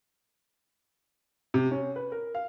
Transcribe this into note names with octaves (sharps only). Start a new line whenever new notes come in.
C3
C#4
B4
A#4
F5